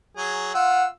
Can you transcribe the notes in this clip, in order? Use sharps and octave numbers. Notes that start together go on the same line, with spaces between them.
F#3 G#4
F4 F#5 E6